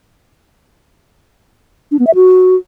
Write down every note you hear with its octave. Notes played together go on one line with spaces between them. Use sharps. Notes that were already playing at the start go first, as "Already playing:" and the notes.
D4
B3
E5
F#4